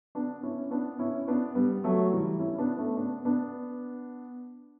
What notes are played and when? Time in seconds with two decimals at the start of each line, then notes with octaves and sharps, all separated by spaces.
0.15 B3 D4
0.43 C#4 E4
0.71 B3 D4
0.99 C#4 E4
1.28 B3 D4
1.55 G3 B3
1.84 F#3 A3
2.12 E3 G3
2.39 C#4 E4
2.58 B3 D4
2.77 A3 C#4
2.97 B3 D4
3.25 B3 D4